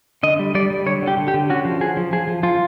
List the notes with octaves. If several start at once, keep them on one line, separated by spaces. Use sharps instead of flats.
D3 D#5
G3
G3 D5
G3
D3 C#5
D3
G4
D3
G4
D3
C#4 F#4
F3
F3 G#4
F3
F3 G#4
F3
F3 F4